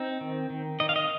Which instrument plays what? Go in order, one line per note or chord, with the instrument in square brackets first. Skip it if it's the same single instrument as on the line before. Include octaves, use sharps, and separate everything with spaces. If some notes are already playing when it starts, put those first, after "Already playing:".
Already playing: [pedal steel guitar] C4 D#4
D#3
D#3
D#3 D#5
F5
D#5